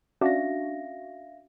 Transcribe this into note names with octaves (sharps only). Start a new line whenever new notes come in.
C#4 D4 F#4 E5 F5 A#6